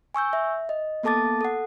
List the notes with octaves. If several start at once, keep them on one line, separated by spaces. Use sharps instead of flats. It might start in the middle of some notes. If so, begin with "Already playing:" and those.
G#5 C#6 E6 G6
E5
D#5
A#3 B3 A4 A5 D6 A6
A4 F#5